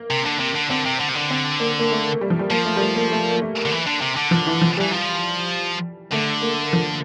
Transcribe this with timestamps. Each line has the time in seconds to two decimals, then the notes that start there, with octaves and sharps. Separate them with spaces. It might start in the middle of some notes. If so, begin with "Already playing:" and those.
Already playing: A#3
0.10 C3
0.26 D3
0.40 C3
0.55 D3
0.70 D3 C4
0.85 C3
1.00 D3
1.09 C3
1.15 D3
1.30 C4
1.60 A#3
1.79 A#3
1.91 A3
2.21 G3
2.30 F3
2.39 G3
2.51 F3 A#3
2.65 A3
2.76 G3
2.81 A3
2.95 A#3
3.11 A3
3.31 A#3
3.42 A3
3.65 D3
3.71 E3
3.86 D3
4.01 C3
4.16 D3
4.31 F3
4.47 E3
4.61 F3
4.77 E3 G3
4.92 F3
6.12 D3 A3
6.42 A#3
6.73 F3